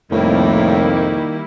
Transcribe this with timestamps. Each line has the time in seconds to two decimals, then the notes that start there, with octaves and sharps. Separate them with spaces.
0.12 C2 F2 A2 D#3 G3 A#3 E4